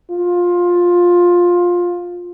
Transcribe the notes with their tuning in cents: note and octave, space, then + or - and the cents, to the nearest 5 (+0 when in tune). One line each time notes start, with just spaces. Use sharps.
F4 +15